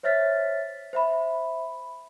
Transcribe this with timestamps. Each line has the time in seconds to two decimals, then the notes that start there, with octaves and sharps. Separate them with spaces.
0.03 C5 C#5 E5 F6 A6 B6
0.93 C5 E5 B5